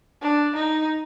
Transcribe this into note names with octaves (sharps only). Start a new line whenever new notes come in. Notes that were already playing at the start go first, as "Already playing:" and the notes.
D4
D#4